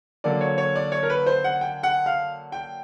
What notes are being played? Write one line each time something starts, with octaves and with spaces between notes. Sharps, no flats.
D3 F#3 A#3 D5
C#5
C#5
D5
C#5
A#4
B4
C5
F#5
G5
F#5
F5
G5